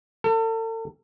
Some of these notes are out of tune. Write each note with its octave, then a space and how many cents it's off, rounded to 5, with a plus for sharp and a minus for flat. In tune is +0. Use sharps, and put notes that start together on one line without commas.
A4 +40